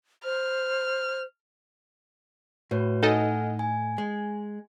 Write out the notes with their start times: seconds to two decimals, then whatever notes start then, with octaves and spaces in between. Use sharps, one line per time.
0.24 C5 F6
2.71 A2 F#4 B4 C#5
3.03 D#4 A4 D#5 F#5 G#5 F6
3.59 G#5
3.98 G#3